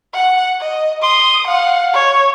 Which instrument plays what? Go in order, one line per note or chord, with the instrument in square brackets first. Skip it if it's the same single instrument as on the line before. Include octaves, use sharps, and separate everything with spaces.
[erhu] F#5
D#5
[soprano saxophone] C6 [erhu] D#6
[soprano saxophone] F5 [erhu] F#5
[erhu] C#5